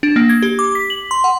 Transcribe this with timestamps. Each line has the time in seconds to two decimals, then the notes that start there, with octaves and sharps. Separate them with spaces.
0.03 D4
0.16 A#3
0.29 G#6
0.43 G4
0.59 D6
0.75 B6
0.90 F#7
1.11 C6
1.24 F#5